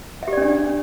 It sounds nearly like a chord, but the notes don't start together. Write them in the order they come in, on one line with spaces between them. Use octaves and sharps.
E5 G4 D5 C#4 D4